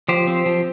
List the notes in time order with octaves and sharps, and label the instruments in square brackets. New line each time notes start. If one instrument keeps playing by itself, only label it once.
[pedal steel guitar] F3 G4 C5
C4
F3